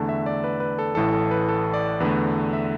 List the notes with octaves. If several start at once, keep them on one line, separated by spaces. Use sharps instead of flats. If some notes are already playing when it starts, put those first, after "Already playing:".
Already playing: E2 D3 A3 A5
E5
D5
B4
B4
A4
A1 A2 E3 A4
A4
B4
A4
D5
E2 D3 A3 B4
E5